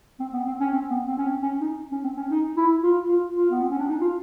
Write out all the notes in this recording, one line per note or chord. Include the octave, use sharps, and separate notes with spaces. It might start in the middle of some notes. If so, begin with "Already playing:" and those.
C4
B3
C4
C#4
C4
B3
C4
C#4
C4
C#4
D#4
C#4
C4
C#4
D#4
E4
F4
F4
F4
B3
C4
C#4
D4
D#4
F4